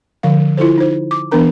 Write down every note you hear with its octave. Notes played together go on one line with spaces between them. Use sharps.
D3 F3 F5
E4 F4 A4 C5
D#4 C5
D6
E3 B3 D4 A#4 A#5